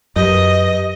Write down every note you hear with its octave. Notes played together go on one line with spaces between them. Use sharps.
F#2 G4 B4 D#5